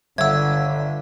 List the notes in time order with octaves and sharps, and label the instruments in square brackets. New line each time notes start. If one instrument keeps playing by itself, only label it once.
[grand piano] G1 [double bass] D3 [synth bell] E5 F#5 [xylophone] E6 G#6